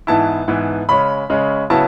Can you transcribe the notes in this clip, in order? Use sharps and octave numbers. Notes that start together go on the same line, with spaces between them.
G#2 E3 B3 E4 A5
G#2 E3 B3 E4
C#3 G#3 C#4 B5
C#3 G#3 C#4
C#3 F#3 B3 E4 A5